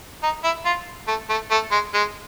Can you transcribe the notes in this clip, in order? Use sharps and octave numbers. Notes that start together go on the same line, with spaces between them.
D#4
E4
F4
A3
A3
A3
G#3
G#3